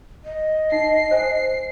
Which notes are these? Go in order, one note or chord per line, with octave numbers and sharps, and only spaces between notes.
D#5
D#4 C7
C5 G#5